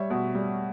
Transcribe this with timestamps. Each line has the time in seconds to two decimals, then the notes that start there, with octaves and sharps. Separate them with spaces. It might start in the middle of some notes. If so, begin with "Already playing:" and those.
Already playing: G3 C#5 E5
0.10 B2
0.35 G3